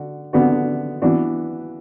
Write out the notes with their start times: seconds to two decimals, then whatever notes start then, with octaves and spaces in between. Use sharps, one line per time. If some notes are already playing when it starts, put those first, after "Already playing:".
Already playing: D3 F#4
0.33 D3 B3 D4 F#4
1.02 E3 B3 D4 F#4